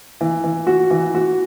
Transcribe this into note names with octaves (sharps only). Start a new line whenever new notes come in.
E3
E3
F#4
E3
F#4